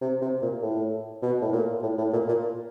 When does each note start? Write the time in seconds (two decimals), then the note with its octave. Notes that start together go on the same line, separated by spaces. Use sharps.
0.01 C3
0.22 C3
0.42 A#2
0.62 A2
1.22 B2
1.41 A2
1.52 A#2
1.83 A2
1.98 A2
2.13 A#2
2.28 A#2